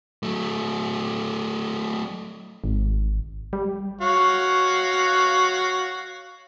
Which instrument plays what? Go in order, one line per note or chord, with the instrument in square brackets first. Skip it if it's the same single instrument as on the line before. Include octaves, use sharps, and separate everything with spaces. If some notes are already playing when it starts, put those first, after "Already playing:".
[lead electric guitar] F#3 A3
[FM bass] G#1
G3
[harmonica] F#4 C#5 F5